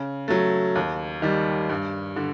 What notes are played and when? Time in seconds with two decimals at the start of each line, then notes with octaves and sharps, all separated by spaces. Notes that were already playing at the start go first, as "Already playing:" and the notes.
Already playing: C#3
0.28 F#3 A3
0.75 D#2
1.22 D#3 G3
1.69 G2
2.16 D3